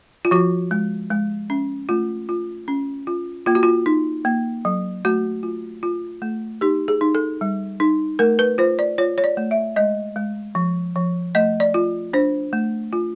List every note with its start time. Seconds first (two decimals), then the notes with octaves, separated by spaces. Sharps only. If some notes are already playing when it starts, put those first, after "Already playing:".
0.25 F4
0.31 F3 F#4
0.71 G#3
1.11 G#3
1.50 C#4
1.89 A3 F4
2.29 F4
2.68 C#4
3.07 F4
3.46 A#3 F4
3.55 F#4
3.63 F4
3.86 D#4
4.25 A#3
4.65 F#3
5.05 A3 F#4
5.43 F4
5.83 F4
6.22 A3
6.61 D#4 G4
6.88 G#4
7.01 D#4
7.15 A4
7.41 G3
7.80 D#4
8.19 A3 A#4
8.39 B4
8.58 F4 C5
8.79 D5
8.98 F4 C#5
9.18 C#5
9.24 D5
9.37 A3
9.51 E5
9.76 G#3 D#5
10.16 G#3
10.55 F3
10.96 F3
11.35 A3 D#5
11.60 D5
11.74 F4
12.13 D4 C5
12.53 A3
12.93 F4